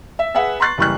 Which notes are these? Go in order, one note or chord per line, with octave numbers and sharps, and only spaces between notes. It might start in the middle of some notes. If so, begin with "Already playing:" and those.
E5
G#4 B4 E5 F#5
A#5 C6 C#6 F#6 A6 C7
F#1 E3 G3 C#6 F6 F#6